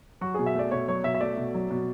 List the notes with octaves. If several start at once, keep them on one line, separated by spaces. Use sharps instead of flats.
F#3 F#4
B2 G#4
E5
A3 D5
B2 C#5
F#3 C#5
B2 E5
E5
A3 D5
B2
F#3
B2